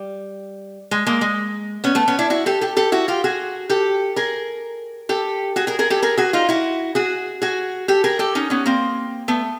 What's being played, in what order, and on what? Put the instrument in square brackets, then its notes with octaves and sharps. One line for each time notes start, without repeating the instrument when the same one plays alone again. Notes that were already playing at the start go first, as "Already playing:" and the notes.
Already playing: [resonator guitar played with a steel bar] G3
G#3
G#3 A#3
G#3
B3 C#4
A3 B3
B3 C#4
D4 E4
E4 F#4
G4 A4
G4 A4
G4 A4
E4 F#4
F4 G4
F#4 G#4
G4 A4
G#4 A#4
G4 A4
F#4 G#4
G#4 A#4
G#4 A#4
G4 A4
G#4 A#4
F#4 G#4
D#4 F4
E4 F#4
F#4 G#4
F#4 G#4
G4 A4
G#4 A#4
G4 A4
C#4 D#4
B3 C#4
A#3 C4
A3 B3